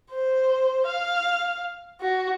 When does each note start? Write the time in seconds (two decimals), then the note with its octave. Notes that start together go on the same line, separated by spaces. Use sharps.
0.11 C5
0.86 F5
2.01 F#4